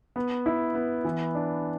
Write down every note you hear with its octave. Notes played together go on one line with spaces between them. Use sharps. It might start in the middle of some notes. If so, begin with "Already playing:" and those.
B3
E4
B3
E3
D4